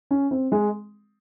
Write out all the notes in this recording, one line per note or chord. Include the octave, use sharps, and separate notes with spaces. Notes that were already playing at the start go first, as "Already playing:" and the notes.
C#4
C4
G#3